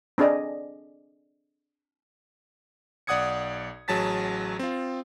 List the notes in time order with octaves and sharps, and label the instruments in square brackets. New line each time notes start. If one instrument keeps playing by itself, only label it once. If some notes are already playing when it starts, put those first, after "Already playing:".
[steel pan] C4 D4 G#4 D5 D#5
[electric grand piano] B1 D5 F#5 D#6 G#6 C#7
A1 F#3 G#4 A5 A6 B6
C4 F4